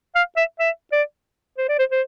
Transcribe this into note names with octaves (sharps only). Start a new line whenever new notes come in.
F5
E5
E5
D5
C5
D5
C5
C5